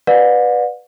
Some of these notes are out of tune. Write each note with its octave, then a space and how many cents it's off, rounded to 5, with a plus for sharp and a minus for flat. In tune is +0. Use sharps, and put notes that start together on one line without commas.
B4 +0 D5 +15 F#5 -45